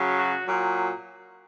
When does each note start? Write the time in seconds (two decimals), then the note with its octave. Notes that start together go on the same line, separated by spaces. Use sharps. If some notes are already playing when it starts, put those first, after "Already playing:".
Already playing: C#3 F#3
0.18 F#4
0.46 A#2 F#3